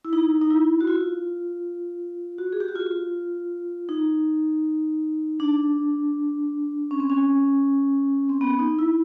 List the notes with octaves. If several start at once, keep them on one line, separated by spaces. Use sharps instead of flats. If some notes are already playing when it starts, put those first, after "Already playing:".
E4
D#4
D#4
E4
F#4
F4
F#4
G#4
G4
F#4
F4
D#4
D4
C#4
C4
C#4
C4
B3
D#4
E4